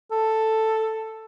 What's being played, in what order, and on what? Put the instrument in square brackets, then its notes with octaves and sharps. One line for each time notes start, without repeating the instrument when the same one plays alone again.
[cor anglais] A4